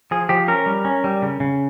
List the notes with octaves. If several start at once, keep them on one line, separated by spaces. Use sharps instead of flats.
F3 G#4
F3 G4
C#4 A#4
G3
C#4
G3
C#3
C#3